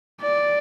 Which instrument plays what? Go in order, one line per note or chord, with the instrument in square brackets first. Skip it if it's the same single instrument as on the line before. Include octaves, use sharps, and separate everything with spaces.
[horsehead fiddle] D5